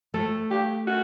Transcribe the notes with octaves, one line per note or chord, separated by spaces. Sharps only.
A3 A4
G4
F#4